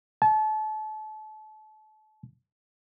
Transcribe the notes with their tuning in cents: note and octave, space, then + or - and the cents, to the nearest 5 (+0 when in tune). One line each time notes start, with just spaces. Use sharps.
A5 -30